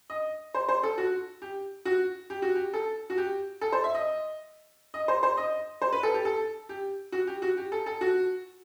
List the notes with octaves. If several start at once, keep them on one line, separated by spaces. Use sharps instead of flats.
D#5
C5
C5
A4
F#4
G4
F#4
G4
F#4
G4
A4
F#4
G4
A4
C5
E5
D#5
D#5
C5
C5
D#5
C5
B4
A4
G4
A4
G4
F#4
G4
F#4
G4
A4
A4
F#4